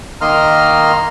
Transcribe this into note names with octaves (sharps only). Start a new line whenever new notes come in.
D#3 A#3 D#5 A#5 C6 F6